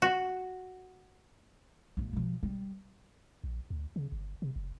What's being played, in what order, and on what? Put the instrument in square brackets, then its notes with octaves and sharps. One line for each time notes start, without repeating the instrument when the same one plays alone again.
[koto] F#4
[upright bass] A1 A#3
B2 F3
G3
[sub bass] A#1
D2
C#3
G1
C3
F#1